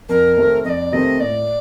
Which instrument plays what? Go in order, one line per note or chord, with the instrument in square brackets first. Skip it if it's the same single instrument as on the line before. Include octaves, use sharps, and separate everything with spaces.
[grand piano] F2 [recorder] A#4
[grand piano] C3 D#3 A3 C4
[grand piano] F2 [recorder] D5 D#5
[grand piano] C3 D#3 A3 C4 [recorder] D#5
[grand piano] A2 [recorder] D5